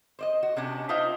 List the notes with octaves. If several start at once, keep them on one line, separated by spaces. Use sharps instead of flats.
C5 D5 D#5
F#4
C3 C#4 D4
D#4 F4 C5 E5 F5 G5